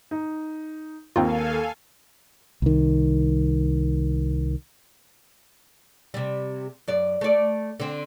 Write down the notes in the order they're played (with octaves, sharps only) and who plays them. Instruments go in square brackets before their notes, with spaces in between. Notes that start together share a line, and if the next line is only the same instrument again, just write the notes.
[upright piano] D#4
[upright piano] D#2 A#3 [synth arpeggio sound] C4 D#4 F4 [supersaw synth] A4 F5 G#5
[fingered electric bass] C2 D#3
[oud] C3 G3
F#2 D5
A3 D5
D3 C4